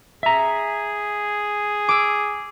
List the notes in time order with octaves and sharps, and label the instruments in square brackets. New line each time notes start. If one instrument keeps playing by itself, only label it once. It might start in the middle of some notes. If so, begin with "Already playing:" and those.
[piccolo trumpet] G#4 [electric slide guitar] E5 A#5
[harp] D6 E6